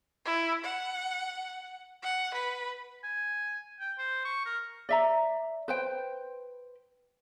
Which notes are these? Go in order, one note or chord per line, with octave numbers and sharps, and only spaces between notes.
E4
F#5
F#5
B4
G#5
G5
C5
C#6
A#4
D5 E5 A#5
B4 C5 G5